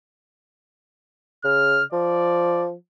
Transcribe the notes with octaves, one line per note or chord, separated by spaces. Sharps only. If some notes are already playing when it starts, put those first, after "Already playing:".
C#3 F6
F3 D5